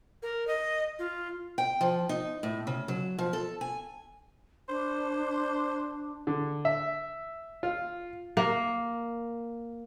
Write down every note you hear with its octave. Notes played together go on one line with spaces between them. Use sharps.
A#4
D#5
F4
G5
F3
D#4
A2
C#3
F#3
F3
A4
G#5
D4 C5
D3
E5
F4
A#3